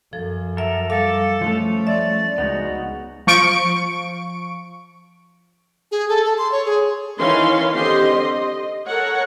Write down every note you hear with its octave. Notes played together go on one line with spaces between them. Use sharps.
F#2 F3 A4
F#3 A4 A#4 E5
G3 A4 F5 D6
F3 A3 C#4
D5 E5
C#2 B3 D#4 F#4
F3 C#6 D7
G#4
A4
A4
C6
C#5
G#4
D#3 E3 C#4 F5 C6
D3 C4 G4 D#5 C6
D#5
A4 A#4 C#5 F#5